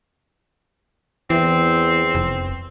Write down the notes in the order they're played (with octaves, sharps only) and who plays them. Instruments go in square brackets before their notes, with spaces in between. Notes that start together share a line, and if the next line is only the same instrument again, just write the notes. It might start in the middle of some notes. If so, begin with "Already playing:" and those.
[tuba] E2 [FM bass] E3 [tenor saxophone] C4
[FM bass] F1